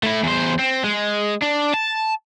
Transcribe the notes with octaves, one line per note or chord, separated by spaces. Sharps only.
A3 E4
E2 C5
C4
G#3
D4
A5